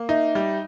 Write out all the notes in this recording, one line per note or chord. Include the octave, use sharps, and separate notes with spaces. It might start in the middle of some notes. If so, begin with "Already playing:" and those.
Already playing: A#3
D#4 E5
G3